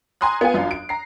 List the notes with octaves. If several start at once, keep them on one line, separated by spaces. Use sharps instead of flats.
G#5 A#5 C6 D#6 F#6
B3 F4 F5 G#5
G1 F#2 D4 F4 F5
D7
A#5 C7